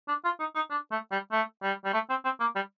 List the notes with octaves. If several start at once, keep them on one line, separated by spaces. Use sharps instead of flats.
D4
F4
D#4
D#4
D4
A3
G3
A3
G3
G3
A3
C4
C4
A#3
G3